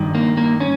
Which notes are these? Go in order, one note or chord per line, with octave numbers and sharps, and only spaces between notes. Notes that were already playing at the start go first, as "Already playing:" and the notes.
Already playing: G2 D#3
A#3
A#3
C#4